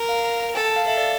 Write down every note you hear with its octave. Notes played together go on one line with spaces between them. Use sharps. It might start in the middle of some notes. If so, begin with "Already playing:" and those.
Already playing: A#4
F5
A#5
A#5
A4 G5
A5
F5
A4 E5
D5